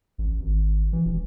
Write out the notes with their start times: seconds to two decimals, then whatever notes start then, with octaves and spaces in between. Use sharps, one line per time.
0.18 A1
0.40 G#1
0.93 E3
1.05 E1